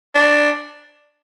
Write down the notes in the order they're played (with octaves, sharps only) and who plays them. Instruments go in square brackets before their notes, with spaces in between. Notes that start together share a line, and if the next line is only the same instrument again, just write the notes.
[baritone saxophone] D4